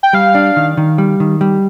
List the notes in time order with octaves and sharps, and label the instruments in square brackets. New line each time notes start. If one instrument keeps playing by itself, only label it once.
[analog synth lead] G5
[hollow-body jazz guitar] G3 [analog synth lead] F5
[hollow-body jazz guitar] D4
D#3
D#3
G3
D#3
G3